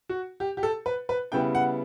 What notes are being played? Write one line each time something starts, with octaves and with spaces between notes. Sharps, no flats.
F#4
G4
G4
A4
B4
B4
C#3 G3 B3 E4 G5
F#5